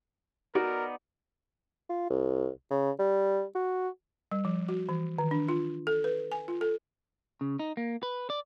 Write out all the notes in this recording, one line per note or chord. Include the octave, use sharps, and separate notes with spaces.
B3 D#4 F#4 A#4 D5
F4
C2
C#3
G3
F#4
G3
F3
F#4
E3
D#3
D4
F4
A4
B4
G#5
F4
A4
C#3
D#4
A#3
B4
D5